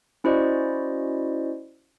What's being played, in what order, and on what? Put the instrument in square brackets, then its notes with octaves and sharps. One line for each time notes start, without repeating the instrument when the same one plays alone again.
[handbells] C#4 E4 F#4 C5 D5 D#5